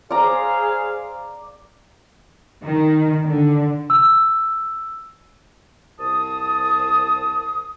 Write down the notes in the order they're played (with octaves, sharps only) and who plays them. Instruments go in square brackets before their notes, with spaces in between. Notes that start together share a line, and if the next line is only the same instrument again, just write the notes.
[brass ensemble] G#4 C5 F5 [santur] D5 A#5
[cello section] D#3
D3
[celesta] E6
[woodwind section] C2 A5 D#6